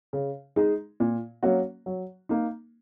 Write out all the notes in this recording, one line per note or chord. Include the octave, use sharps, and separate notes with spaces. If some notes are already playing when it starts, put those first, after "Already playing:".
C#3
G#3 D#4 G#4
A#2
F#3 A#3 C#4 F#4
F#3
A#3 D#4